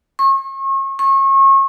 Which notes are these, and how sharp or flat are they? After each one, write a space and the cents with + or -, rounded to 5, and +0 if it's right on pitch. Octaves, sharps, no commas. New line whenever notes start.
C#6 -40
C#6 -35